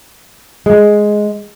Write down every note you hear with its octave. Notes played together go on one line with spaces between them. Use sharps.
G#3